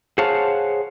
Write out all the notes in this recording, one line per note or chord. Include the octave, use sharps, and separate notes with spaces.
G#4 C5 C#5 F5 F#5 A5